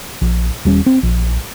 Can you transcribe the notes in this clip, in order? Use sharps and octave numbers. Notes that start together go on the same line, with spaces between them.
A#1
D#1 G3 C#4
C4
A#1